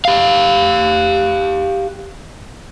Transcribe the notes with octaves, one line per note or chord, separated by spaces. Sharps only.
G4 F5